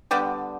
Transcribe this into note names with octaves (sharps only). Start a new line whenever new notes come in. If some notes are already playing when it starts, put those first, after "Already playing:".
D3 G3 B3 G4